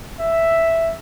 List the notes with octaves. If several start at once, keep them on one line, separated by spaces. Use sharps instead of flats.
E5